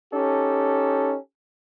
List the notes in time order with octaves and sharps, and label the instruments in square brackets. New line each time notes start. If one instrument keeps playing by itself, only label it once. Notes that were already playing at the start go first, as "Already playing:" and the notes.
[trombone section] C#4 D#4 G4 A4